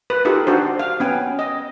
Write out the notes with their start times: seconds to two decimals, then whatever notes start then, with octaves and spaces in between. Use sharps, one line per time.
0.10 B4
0.25 D#4 F4 G4 A4
0.47 D4 F#4 C5
0.79 F5
1.00 B3 C#4 G5
1.39 D#5